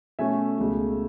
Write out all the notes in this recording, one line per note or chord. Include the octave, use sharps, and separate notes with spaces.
B2 A3 C#4 E5 G#5
C#2 B2 A3